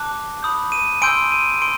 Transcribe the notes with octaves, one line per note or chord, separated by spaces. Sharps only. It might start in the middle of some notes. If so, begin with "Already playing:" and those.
Already playing: A5 D6 F#6
B5 D#6 G6
D#7
G#5 C6 E6 G6 D7
D#7
C6 D7